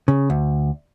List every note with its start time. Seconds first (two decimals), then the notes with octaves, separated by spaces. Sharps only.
0.08 C#3
0.30 D2